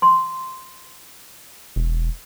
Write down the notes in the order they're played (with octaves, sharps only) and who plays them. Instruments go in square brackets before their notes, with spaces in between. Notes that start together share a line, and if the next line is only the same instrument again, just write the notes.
[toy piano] C6
[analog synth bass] E1